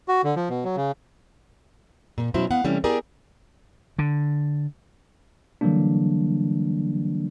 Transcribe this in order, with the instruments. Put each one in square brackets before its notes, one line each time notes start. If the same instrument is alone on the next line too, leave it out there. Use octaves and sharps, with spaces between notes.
[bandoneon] F#4
D3
F3
B2
F#3
C#3
[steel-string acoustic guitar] A#2
B2 F#3 C#4 E4 C5
B3 F5 F#5
C3 E3 G3 A3 C#4
B3 E4 G4 G#4 A#4 D5
[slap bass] D3
[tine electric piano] D3 E3 F#3 G3 A#3 D4